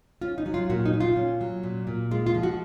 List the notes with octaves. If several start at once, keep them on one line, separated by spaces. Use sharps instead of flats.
C#4 F4
D#4
F#3
F4
A#2 F#4
D#4
A#2
F4
C#4
F#3
A#2
A#2
G#3 F4
F4
F3
F#4